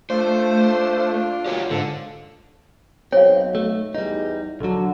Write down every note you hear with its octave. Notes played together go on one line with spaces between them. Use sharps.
A3 D4 F4 C5
F4
F#3 G4 A#4 C#5
G#2 D3 A4
B1 C4 C#5 F5
A3
E2 G3 D#4
B1 D3 F#3